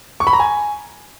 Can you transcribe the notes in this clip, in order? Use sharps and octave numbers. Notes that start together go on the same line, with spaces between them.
C#6
B5
A#5
G#5